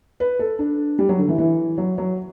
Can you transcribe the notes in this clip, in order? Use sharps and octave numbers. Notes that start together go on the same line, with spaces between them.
B4
A4
D4
G3
F#3
D3
E3
E3
F#3
F#3